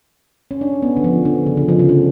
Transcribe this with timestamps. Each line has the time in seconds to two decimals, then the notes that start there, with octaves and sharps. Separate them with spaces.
0.51 C#4
0.61 D4
0.82 B3
0.97 D3
1.04 F3
1.25 D3
1.46 C#3
1.57 D3
1.69 F3
1.79 C#3
1.89 D3